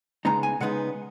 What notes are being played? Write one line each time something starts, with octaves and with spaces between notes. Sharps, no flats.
C#3 G#3 B3 D#4 A#5
G#5
C#3 G#3 B3 D#4 F#5